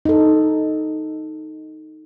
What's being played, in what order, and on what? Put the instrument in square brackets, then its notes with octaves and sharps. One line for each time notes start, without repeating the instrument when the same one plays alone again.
[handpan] D#4 A4